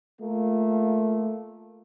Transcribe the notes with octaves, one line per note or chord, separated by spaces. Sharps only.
A3 A#3 F4